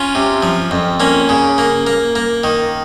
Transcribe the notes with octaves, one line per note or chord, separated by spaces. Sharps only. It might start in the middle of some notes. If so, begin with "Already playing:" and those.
Already playing: C#4 F4
C3
F3
F2
A#3 C#4
C#3
A#3
A#3
A#3
D#3